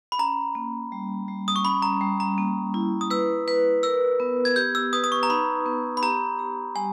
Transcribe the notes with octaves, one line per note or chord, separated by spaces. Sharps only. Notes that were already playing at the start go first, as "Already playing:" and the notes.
B5
C#4 A#5
A#3
G3
G3
D#6
C#6
C#4 B5
A#5
G3
A#5
A#3
E4
D#6
B4 E6
B4
A#4 E6
B3
G#6
G4 G6
E6
B4 D#6
D#6
C#6
A#5
D#4 B5
B3
B5
G4 A#5
G4
G3 G#5